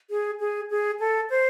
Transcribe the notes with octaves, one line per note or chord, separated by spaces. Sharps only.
G#4
G#4
G#4
A4
C5